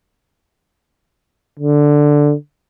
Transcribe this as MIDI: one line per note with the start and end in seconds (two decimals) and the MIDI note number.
1.59 2.34 50